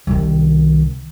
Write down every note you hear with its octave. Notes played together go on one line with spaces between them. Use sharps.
C2 D#3